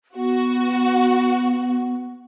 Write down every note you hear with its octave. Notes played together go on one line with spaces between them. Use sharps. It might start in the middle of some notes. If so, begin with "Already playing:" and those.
B3 F#4